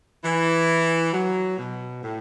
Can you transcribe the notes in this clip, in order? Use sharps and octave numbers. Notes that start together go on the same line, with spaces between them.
E3
F#3
B2
A2